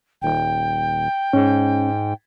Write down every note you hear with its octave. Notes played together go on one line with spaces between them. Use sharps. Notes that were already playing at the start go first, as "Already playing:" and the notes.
D#1 G5
G#2 C#4